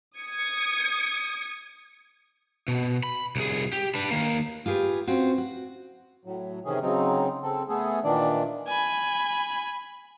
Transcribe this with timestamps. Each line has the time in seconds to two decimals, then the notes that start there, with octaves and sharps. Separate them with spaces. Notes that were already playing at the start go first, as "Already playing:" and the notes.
0.18 D#6 G#6 C#7
2.68 B2
3.03 B5
3.36 C2 G#4
3.73 G4
3.95 D4 B4
4.11 D#3 A#3
4.66 F4 G4 G#4 B4
5.07 C4 C#4 F4 F#4
5.38 F#4
6.25 A2 F#3
6.65 C3 D#3 E3 C#4 G#4
6.82 C#3 F#3 C4 D#4
7.43 C#3 C4 A4
7.69 A3 B3 G#4 A4
8.04 A#2 D#3 E3 D4 D5
8.68 G#5 B5